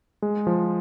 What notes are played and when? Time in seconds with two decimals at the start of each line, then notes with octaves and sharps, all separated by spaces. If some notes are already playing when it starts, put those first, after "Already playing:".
0.22 G#3
0.47 F3